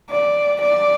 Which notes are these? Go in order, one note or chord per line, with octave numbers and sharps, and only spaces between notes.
D5
D5